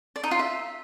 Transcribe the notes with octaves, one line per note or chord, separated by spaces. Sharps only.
D5
D#4
F4
E5